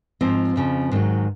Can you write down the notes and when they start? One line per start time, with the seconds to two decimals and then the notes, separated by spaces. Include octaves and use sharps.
0.21 G#2 F3 C4
0.56 F2 C#3 F3
0.91 G#2 D#3 F#3